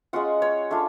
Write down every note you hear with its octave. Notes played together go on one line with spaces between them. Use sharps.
G#3 C#4 F4 F#5
C#5
A3 D4 F4